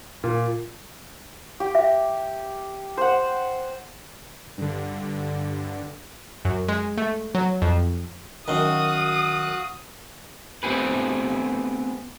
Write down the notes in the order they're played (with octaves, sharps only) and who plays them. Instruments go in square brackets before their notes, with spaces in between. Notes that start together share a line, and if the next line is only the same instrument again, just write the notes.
[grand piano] A#2
[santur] G4
[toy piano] E5
[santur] C5 F#5
[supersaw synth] G2 D3
[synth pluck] F#2
G#3
A3
F#3
F2
[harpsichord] F#2 D#3 [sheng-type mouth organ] F#4 F5 F#6 [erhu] D#6
[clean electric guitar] A3 B3 C4 G4 G#4 B4